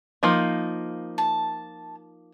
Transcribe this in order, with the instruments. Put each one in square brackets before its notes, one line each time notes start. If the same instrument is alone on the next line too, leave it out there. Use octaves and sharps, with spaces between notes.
[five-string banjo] F3 A#3 D#4
[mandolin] A5